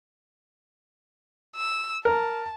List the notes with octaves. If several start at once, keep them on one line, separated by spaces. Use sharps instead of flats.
E6
A#4 A5